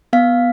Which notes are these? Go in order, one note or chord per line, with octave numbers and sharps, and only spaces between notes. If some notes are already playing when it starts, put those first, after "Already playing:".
B3 F5